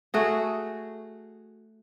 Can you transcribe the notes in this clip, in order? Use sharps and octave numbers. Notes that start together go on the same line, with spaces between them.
A3 F#4 G#4